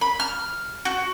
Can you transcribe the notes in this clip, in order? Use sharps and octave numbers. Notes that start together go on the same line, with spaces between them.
B5
F6
F#4